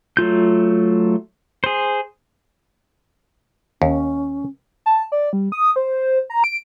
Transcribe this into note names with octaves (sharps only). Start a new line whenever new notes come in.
F#3 A3 F4 G6
G#4 C5
D#2 C#4
A5
D5
G3
D#6
C5
A#5
D7